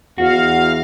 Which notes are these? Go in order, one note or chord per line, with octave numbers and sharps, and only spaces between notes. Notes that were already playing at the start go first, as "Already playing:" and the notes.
E2 F#4 F5